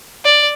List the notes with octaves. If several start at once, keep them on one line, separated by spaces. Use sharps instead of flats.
D5